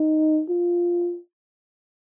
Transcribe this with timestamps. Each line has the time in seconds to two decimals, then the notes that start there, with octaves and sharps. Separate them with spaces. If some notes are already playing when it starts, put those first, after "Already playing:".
Already playing: D#4
0.49 F4